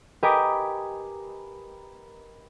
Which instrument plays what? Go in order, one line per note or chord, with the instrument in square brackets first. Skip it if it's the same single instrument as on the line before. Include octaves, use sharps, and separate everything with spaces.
[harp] G4 A#4 B4 D#5 G#5 D6